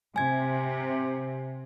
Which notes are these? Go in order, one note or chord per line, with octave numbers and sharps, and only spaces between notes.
C3 G#5 G#6